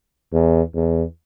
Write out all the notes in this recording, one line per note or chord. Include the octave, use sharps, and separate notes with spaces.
E2
E2